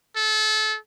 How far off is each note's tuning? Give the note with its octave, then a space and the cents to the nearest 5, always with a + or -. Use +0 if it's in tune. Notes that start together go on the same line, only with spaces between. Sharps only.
A4 -30